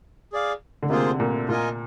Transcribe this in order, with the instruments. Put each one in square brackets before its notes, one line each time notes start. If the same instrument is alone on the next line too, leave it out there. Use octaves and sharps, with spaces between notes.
[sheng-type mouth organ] G#4 D5 F5
[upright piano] D3
[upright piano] C3 [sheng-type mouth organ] A#3 F4 G#4 C5
[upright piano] A#2
[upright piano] A#2 [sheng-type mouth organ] F4 A#4 D#5 G#5